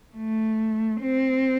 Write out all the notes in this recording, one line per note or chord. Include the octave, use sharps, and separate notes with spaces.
A3
C4